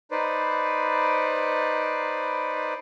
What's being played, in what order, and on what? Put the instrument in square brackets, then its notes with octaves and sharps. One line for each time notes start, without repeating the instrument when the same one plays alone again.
[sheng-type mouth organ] D#4 B4 C5 D5